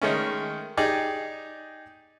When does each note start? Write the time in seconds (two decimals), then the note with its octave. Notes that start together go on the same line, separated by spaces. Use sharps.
0.01 D#3 G#3 A3 C#4
0.77 D#4 G4 G#4 D5